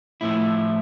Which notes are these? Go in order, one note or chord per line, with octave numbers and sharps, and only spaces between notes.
A2 F3 A3 E4